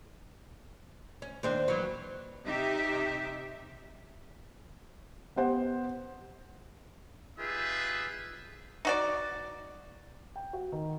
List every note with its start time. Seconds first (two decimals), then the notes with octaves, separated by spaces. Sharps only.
1.22 C#4
1.43 D#2 C4 D4
1.68 E3 F#3
2.44 C3 D#4 G4 E5
5.36 B3 G4 C5 F#5
7.39 D#4 F4 G4 G#4 B4 E5
8.85 D#4 F#4 D5
10.36 G5
10.53 F#4
10.72 D#3